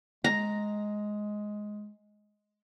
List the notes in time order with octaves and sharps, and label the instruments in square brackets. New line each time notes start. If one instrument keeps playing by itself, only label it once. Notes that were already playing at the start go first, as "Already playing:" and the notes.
[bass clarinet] G#3 [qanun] A#5